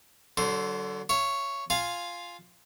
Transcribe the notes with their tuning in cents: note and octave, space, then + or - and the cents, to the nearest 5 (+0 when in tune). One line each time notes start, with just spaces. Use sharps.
D3 +0 F#3 +40 C5 +0
C#5 +0 F5 -45
F4 +0 F5 +0 G#5 +0